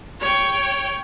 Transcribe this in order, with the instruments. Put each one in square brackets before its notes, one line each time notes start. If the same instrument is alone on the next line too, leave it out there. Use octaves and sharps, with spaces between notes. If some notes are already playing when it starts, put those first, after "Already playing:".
[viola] C#5 G5